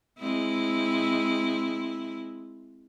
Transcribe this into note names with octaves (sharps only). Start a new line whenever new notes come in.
G#3 C4 E4